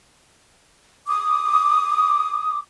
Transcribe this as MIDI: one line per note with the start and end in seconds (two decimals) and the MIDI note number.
1.07 2.59 86
1.07 2.59 87